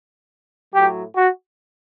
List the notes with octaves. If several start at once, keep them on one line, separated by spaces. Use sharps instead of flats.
A2 F#3 G4
F#4